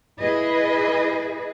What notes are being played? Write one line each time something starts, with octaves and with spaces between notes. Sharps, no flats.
E4 G#4 B4 D#5